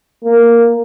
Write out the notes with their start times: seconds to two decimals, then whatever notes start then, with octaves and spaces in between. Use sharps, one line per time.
0.24 A#3